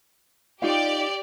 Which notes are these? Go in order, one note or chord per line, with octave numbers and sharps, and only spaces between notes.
D#4 F4 G4 D5 F5